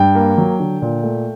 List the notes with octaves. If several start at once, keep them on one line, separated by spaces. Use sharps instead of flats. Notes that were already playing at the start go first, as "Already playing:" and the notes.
Already playing: G2 G5
A#3
F#3
D3
A#2
A3